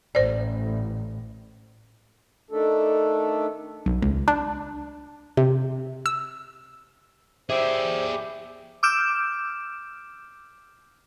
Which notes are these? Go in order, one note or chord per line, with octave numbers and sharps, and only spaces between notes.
A1 C5 D5
D#3 A3 D4 A4
B1
C#2
D4
C3
E6
G4 G#4 C5 D5 E5
D6 E6 F6 G6 D7 E7